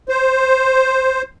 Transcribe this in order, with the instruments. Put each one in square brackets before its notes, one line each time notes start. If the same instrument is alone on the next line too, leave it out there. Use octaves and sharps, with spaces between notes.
[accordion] C5